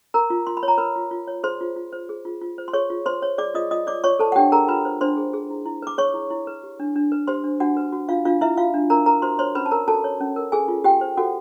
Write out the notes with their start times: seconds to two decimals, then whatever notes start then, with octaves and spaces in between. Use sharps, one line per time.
0.14 A#4 A#5
0.30 F4
0.47 F4 C6
0.57 B5
0.63 C#5
0.68 A#5
0.78 A#4 B4 B5
0.96 F4
1.11 F4
1.27 C#5
1.43 G#4 C5 C6
1.61 F4
1.76 F4
1.92 C5
2.09 G#4
2.25 F4
2.41 F4
2.58 C5
2.68 C6
2.73 G#4 C#5 C#6
2.90 F4
3.06 F4 C5 C6
3.22 C#5
3.38 G#4 D5 D6
3.54 F4 D#5 D#6
3.71 F4 D#5 D#6
3.87 C#5 D5 D6
4.04 F4 C#5 C#6
4.19 A4 C5 A5
4.32 F#5
4.36 D4 G4 G5
4.52 G#4 A#4 A#5
4.68 F4 B4 B5
4.85 C5
5.01 D4 C5 C6
5.17 G#4
5.33 G#4
5.50 E4
5.66 E4
5.82 B4 D6
5.98 G#4 C#5 C#6
6.14 E4
6.30 E4
6.47 B4
6.63 G4
6.80 D4
6.96 D4
7.12 B4
7.27 G4 C5 C6
7.44 D4
7.60 D4 F#4 F#5
7.77 B4
7.92 F#4
8.09 D4 F4 F5
8.25 D4 F4 F5
8.41 E4 B4 E5
8.57 F4 F#4 F5
8.74 D4
8.90 D4 A#4 A#5
9.06 A#4 B4 A#5
9.22 F#4 C5 C6
9.39 C5 C#5 C6
9.55 C#4 B4 B5
9.66 A5
9.71 A#4 A#5
9.88 F#4 A4 A5
10.04 C#5
10.20 C#4
10.36 A#4
10.52 G#4 A4 G#5
10.68 F4
10.84 F4 G4 G5
11.01 C5
11.17 F#4 A4 F#5